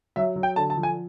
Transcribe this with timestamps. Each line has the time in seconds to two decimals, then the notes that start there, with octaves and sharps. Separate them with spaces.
0.16 F#3 E5
0.36 F#3
0.43 G5
0.56 D3 A5
0.70 A5
0.77 F3
0.83 G#5